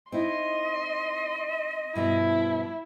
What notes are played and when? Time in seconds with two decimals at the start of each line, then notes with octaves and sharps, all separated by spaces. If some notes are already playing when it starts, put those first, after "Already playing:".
0.12 C4 D#4 E4 D#5 C6
1.95 G2 B2 F3 E4